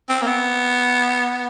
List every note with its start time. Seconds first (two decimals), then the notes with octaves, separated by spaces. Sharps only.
0.09 C4
0.22 A#3
0.27 B3